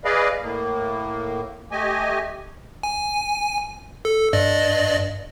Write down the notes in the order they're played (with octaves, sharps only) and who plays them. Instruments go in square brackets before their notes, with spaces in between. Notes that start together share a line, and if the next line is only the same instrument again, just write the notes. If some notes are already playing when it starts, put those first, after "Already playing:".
[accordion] G#4 B4 D5 D#5 F5
A2 A#3
A3 G4 D#5 G#5
[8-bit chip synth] G#5
A4
G2 D5 D#5